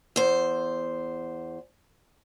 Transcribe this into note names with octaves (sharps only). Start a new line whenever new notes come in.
E2 C5